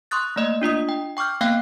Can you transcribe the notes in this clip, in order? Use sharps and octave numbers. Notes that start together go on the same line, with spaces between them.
C6 C#6 D#6 F#6 A6
A3 A#3 D5 D#5
D4 F4 D#5 D#6
G5
G5 C#6 D6 F6 G6
A#3 B3 F5 G5 F#6